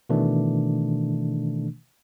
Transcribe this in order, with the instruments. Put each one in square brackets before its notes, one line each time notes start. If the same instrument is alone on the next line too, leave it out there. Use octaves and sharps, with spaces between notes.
[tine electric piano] B2 D#3 E3 A3 D4